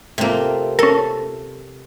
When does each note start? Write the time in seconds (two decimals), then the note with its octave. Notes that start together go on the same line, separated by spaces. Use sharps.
0.18 C3 A3 A#3 C4 F4
0.79 C#4 A4 A#4